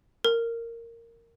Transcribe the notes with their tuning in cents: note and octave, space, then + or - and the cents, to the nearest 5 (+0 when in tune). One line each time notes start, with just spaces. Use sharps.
A#4 -10